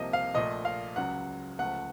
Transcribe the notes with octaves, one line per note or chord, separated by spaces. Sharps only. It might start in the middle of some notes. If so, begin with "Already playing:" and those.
Already playing: C2 C3 F3 A#3 D#5
F5
A#1 A#2 A3 D#5
F5
C#2 C#3 F#3 F#5
C#2 C#3 F3 A3 F#5